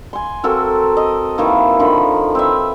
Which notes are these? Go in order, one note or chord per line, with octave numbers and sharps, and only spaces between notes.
G#5 C6
C4 F#4 A4 A#4
D#5
D#3 E3 A#3
D3 D#3 F3 B5
C4 B4 E5